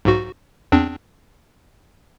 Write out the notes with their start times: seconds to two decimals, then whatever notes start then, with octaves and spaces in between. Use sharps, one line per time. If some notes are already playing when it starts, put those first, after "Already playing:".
0.05 B1 G#2 F#4
0.72 E2 C4 D4